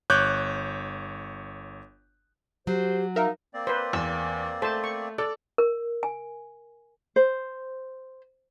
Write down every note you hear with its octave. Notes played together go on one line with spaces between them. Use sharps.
G1 C#5 D6 F#6 G6
F#3 G4 C5
D#4 A#4 E5 F5
A#3 C4 D5
B4 C5
E2 E6
A3 C5 A5
C#6
A4 D5
A#4
G#5
C5